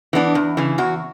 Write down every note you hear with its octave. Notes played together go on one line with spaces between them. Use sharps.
E3 B3 D4
E2
C#3 E3
E2 F#4